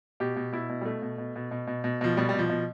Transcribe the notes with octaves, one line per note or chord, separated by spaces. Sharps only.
B2 G4
B2
B2 E4
B2
G3
B2 A3
B2
B2
B2
B2
B2
B2
B2 F3
B2 G3
B2 G3
F3
B2